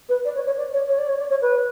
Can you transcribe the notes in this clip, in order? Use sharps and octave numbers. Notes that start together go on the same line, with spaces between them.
B4
D5
C#5
C#5
D5
C#5
C#5
D5
C#5
D5
C#5
B4